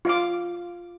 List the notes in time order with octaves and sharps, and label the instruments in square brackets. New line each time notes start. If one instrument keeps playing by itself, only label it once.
[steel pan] F4 F5 D6